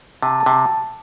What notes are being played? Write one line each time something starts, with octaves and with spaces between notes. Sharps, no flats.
C3 A5
A5
C3